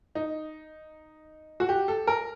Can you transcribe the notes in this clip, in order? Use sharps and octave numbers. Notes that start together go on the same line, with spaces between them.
D#4
F#4
G4
A4
A#4